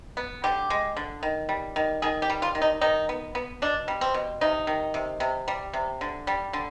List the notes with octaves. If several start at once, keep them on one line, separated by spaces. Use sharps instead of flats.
B3
D3 G4
G#3
D3
D#3
G3
D#3
D#3 G#4
G4
G3
F4
D#3
D#4
D#3 D#4
B3
B3
B2 D4
G3
C4
B2
C3 D#4
D#3
C3
C3
G3
C3
D3
G3
D3